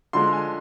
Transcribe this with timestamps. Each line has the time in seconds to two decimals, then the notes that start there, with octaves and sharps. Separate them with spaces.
0.13 D3 F3 G#3 C6
0.33 G#5